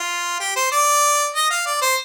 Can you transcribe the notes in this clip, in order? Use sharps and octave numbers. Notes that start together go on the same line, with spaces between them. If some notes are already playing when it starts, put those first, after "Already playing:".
Already playing: F4
G4
C5
D5
D#5
F5
D5
C5